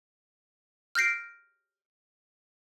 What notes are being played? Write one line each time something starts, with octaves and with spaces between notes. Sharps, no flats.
F6 G6 A#6 C7 D7